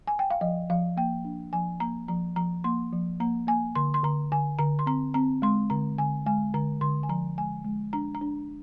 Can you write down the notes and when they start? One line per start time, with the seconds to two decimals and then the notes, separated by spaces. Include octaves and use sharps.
0.07 G#5
0.19 G5
0.31 F5
0.41 F3 D#5
0.70 F3 F5
0.97 A#3 G5
1.25 D4
1.53 F3 G#5
1.80 A#3 A#5
2.08 F3 A#5
2.36 F3 A#5
2.64 A#3 C6
2.93 F3
3.20 A#3 A#5
3.47 A#3 G#5
3.76 D3 C6
3.94 C6
4.03 D3 A#5
4.32 D3 G#5
4.59 D3 A#5
4.79 C6
4.86 C4 A#5
5.14 C4 A#5
5.42 G#3 C6
5.70 D3 A#5
5.98 D3 G#5
6.26 G#3 G#5
6.54 D3 A#5
6.81 D3 C6
7.03 G#5
7.09 F3 A#5
7.38 G#3 G#5
7.65 G#3
7.93 D4 A#5
8.15 A#5
8.21 D4